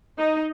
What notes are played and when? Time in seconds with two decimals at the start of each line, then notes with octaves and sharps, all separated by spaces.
0.18 D#4